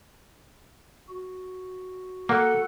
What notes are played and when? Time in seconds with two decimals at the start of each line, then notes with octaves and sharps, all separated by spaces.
1.09 F#4
2.29 A#3 A4 F#5